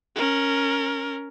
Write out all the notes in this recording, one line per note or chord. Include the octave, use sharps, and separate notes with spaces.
C#4 A#4